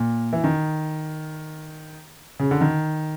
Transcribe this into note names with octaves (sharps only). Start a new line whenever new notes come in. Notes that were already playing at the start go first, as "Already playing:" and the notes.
Already playing: A#2
E3
D#3
C#3
D3
D#3